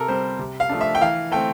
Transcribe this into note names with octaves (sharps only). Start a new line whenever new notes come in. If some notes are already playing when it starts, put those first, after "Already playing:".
Already playing: C3 A4 A#4
G3 C4 C5
C3
F5
F3 A3 D4
E5
G5
E3 F5
A3 C4 G5